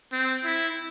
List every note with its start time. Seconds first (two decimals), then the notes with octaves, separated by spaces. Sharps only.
0.13 C4
0.45 E4